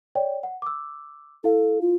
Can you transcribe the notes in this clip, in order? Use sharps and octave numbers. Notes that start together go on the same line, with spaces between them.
C#5 D5 G5
F#5
D6 E6
E4 A4 F5
F4